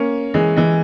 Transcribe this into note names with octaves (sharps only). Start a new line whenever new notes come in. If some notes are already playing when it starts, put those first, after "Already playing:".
Already playing: A#3 C#4
E3 G#3
E3 G#3